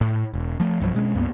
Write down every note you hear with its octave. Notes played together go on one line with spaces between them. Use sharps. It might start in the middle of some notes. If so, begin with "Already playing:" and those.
A2
E1
F3 A3
B1 G2 F3 F#3
B2 G#3 C#4
C#2 G2 A#3 B3